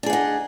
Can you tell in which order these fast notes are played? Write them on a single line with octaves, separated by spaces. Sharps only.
D4 G#4 F#5 D#4